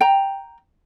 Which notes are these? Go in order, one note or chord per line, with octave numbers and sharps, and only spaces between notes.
G5 A#5